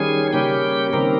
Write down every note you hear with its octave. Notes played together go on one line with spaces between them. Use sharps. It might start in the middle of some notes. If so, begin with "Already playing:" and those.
Already playing: D#3 G3 C#4 G#4 G#5
C#3 G3 A#3 C#4 G4 G5
D#3 G3 A#3 C4 A#4